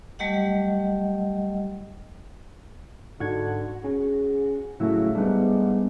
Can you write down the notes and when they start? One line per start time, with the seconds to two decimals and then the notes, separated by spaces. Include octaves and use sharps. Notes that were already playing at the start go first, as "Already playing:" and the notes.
0.19 F#3 G3 A3 G4 D#5 F#5
3.20 G#2 D3 D#4 F#4 G#6
3.84 C#4 G#4
4.80 A2 C#3 F#3 A3 E4 F#4
5.15 G#2 G3 A3 B3 D4